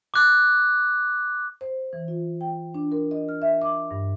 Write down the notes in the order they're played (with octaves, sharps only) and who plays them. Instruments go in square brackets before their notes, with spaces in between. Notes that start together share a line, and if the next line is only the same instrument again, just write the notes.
[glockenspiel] D6 F#6
[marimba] C5
E3
F4
G5
D4
A#4
D#5
F6
E5
D6
G2